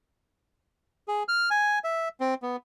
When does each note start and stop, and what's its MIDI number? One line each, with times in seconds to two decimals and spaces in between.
1.08 1.23 68
1.28 1.49 89
1.50 1.79 80
1.84 2.09 76
2.20 2.34 60
2.42 2.56 59